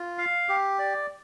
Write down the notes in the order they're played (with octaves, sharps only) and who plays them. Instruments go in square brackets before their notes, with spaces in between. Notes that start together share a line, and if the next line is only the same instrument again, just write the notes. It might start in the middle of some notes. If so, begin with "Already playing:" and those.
Already playing: [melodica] F4
F5
G4
D5